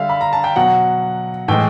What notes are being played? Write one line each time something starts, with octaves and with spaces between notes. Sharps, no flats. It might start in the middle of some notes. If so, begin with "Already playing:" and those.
Already playing: D3 G3 E5 F5
B5
A#5
A5
G5
B2 F#3 F#5
A2 E3 G#3 G5